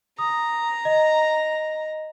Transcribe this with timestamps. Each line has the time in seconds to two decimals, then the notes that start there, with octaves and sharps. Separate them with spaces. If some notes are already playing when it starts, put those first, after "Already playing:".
0.19 A#5 D#6
0.85 D#5